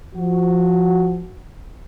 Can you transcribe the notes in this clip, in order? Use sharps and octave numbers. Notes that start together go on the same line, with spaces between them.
F3 F#4